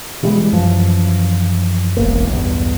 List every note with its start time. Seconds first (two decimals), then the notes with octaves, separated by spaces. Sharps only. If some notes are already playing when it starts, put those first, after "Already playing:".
0.23 B2 E3 G3 G#3
0.53 F#2 E3 F3
1.97 E1 A1 A#3
2.30 B1 E2 G2